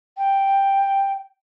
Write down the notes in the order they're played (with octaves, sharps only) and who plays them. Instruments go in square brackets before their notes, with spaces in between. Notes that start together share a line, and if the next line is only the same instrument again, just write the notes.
[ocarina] G5